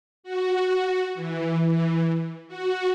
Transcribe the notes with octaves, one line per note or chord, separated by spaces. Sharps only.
F#4
E3
F#4